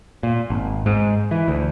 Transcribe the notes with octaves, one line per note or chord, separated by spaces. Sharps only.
A#2
G#1
G#2
E3
D2